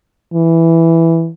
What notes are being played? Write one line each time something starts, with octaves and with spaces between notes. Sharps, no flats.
E3